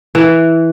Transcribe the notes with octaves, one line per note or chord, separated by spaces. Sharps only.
E3